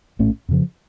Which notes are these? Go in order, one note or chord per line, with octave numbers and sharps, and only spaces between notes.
A#1 A2 A3 C#4
F2 C#3 F3